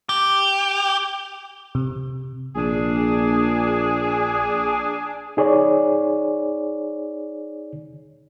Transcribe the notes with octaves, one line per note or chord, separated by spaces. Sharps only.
G4
C3
A#1 D4 G#4
D#4 G#4 C#5 D5